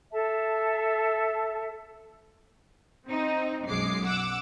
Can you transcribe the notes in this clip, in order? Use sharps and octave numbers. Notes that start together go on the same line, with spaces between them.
A4 E5 A5
C4 D#4
B1 F#2 G#3 D6 C7
F#5 D6 E6